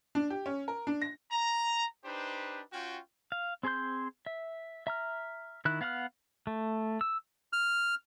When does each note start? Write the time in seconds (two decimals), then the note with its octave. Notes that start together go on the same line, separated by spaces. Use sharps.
0.15 D4
0.30 G4
0.46 C#4
0.68 A#4
0.87 D4
1.02 A#6
1.31 A#5
2.05 D4 D#4 G4 B4 C5
2.72 C#4 F4 F#4 G5
3.32 F5
3.63 C4 G#4 C5 C6 G6
4.26 E5
4.87 E5 A#5 F6
5.65 D#3 E4 F#6
5.81 B3 F5 F#5 A5 F6
6.47 A3
7.01 E6
7.53 F6